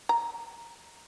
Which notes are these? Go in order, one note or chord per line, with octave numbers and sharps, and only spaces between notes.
A#5